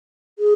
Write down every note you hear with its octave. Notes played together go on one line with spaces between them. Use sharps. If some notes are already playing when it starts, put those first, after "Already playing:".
G#4